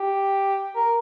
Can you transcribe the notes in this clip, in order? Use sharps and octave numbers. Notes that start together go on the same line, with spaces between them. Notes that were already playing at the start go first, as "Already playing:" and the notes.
Already playing: G4
A#4